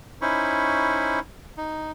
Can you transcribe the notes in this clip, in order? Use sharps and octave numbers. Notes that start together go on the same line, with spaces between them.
C#4 D#4 E4 C5 B5 C#6
D#4